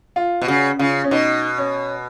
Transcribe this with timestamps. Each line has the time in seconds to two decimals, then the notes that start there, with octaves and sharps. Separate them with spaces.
0.16 F4
0.41 B2
0.47 C#3 F#4
0.79 C#3 F4
1.04 C#4
1.11 B2 D#4
1.58 C#4